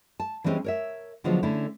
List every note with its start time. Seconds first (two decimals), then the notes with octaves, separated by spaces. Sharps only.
0.20 A5
0.44 E3 G3 G#3 C4 C#4
0.64 A#4 C#5 E5
1.24 D3 F3 F#3 G#3 B3
1.43 D3 A3 C#4 E4